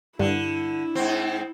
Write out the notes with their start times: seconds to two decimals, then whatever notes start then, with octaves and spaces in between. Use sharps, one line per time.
0.19 G2 D3 E4
0.95 G#2 C4